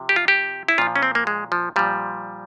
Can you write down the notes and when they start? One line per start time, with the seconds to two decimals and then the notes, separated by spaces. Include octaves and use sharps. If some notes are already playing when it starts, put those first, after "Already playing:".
Already playing: C3 F3
0.09 G4
0.16 F4
0.28 G4
0.68 E4
0.78 A#2 F3 F4
0.96 C#4
1.03 C4
1.15 A#3
1.27 G#3
1.52 F3
1.76 A#2 F3 G3